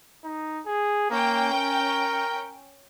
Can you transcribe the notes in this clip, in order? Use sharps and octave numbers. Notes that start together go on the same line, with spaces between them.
D#4
G#4
A#3 C#4 G5
A#4